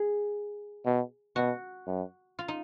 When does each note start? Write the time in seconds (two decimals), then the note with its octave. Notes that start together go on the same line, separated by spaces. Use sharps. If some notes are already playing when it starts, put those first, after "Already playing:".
Already playing: G#4
0.86 B2
1.36 B2 F#4
1.87 F#2
2.39 F4
2.48 D#4